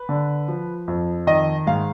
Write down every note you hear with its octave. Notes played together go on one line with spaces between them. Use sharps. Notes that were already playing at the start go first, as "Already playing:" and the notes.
Already playing: B4
D3
F3
F2
D#3 D#5
G#2 F5